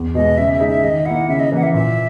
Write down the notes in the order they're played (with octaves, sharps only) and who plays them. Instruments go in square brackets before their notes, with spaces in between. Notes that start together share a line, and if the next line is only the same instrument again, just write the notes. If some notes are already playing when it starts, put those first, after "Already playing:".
Already playing: [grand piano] E2
[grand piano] B2 G#3 [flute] D#5
[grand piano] C#3 [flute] E5
[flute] E5
[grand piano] G#3 D#4 G#4
[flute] E5
[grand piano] D#3 [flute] D#5
[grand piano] A#3 E4 [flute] F#5
[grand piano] C#3 [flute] E5
[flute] D#5
[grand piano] E3 A#3 [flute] F#5
[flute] E5
[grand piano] A#2 [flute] E5